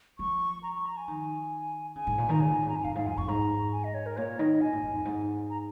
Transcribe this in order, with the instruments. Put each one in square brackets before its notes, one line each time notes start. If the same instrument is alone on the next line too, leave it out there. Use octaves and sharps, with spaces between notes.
[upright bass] F3 [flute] C#6
[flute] A#5
C#6
A#5
G#5
[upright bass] D#3
[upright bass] C#3 [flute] G#5
[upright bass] G#2
A#2
[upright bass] D#3 [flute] A#5
[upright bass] C#3 [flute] G#5
[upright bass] A#2
G#2
[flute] A#5
[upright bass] F2
[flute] G#5
[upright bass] F2 [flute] F5
[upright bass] G#2 [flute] F5
[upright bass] F2 [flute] G#5
[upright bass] F2 [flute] C#6
[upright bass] G#2 [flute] A#5
[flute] G#5
D#5
C#5
A#4
[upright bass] A#2 [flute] C#5
[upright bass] D#3 [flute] D#5
[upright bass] A#2 [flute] G#5
[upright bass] G#2
G#2
F2
G#2
[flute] A#5